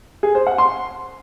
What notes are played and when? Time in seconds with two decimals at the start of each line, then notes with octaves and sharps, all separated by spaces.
0.23 G#4
0.35 C5
0.47 F#5
0.58 C6